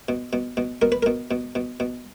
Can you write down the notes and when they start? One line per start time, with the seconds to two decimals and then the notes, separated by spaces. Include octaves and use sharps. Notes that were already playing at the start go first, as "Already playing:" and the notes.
0.09 B2
0.33 B2
0.57 B2
0.82 B2 A#4
0.92 B4
1.03 B2 A#4
1.31 B2
1.55 B2
1.80 B2